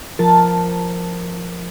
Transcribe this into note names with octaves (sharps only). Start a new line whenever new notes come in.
F3 F4 A#4 A5